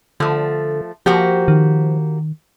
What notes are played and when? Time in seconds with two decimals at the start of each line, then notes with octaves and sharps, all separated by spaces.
0.20 D3 F3 A3
1.06 F3 A#3 F#4 G4
1.48 D#3